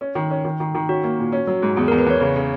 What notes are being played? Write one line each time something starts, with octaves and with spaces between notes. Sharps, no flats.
C#4
D#3
C#4
D#3
D#3
D#3
C#4 F#4
A#3
A#2
C#4
F#3
G#2
E2 G#4
E2 A#4
B4
E2 C#5
C#3
C#3